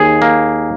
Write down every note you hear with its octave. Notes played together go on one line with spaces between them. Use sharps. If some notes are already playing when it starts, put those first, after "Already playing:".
Already playing: D#2 G#4
A#3